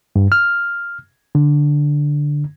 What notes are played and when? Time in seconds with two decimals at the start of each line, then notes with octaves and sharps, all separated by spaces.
0.16 G2
0.32 F6
1.35 D3